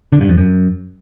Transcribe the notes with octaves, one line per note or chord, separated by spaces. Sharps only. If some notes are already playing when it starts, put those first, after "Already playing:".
D3
G2
F2
F#2